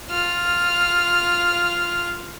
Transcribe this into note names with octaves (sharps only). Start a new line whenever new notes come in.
F4 F6